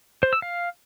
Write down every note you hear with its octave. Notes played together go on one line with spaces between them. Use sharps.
C5
E6
F5